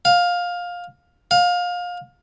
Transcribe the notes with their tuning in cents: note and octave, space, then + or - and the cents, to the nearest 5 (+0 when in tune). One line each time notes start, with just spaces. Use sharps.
F5 +15
F5 +25